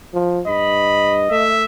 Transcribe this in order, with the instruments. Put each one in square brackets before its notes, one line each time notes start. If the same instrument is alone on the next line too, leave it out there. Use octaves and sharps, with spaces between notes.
[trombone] F3
[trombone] G2 [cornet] D#5 [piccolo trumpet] B5
[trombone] A3 [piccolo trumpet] E5